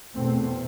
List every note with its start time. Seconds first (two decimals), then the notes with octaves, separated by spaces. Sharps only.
0.15 E2 B2 A3 C4